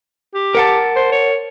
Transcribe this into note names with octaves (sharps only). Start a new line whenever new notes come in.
G4
A#4 F#5 A5
C5
C#5